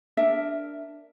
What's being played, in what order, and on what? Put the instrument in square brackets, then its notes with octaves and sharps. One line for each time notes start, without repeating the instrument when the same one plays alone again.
[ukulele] D4 A#4 E5